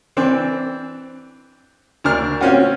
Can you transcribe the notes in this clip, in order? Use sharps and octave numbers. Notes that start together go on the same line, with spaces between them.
E3 C4 D4
D2 D4 A#4 F6
C4 C#4 F4 F#4